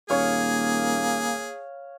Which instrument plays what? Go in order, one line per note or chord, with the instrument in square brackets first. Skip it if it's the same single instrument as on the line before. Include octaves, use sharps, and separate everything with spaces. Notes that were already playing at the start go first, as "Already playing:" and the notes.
[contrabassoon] D#1 [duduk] A#3 [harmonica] G#4 [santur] C#5 F5